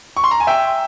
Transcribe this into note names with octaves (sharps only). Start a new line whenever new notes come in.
C#6
C6
A#5
G#5
E5 G5